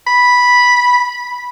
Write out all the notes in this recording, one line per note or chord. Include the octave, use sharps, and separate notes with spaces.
B5